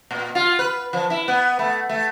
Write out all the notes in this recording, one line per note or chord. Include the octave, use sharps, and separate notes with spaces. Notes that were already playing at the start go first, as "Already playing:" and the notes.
A#2
F4
B4
F3
E4
B3
A3
A3